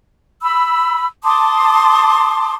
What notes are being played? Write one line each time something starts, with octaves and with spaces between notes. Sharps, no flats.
B5 E6
A5 C6 D6 D#6